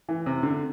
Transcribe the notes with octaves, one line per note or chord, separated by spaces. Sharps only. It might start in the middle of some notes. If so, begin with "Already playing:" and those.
E3
C3
D3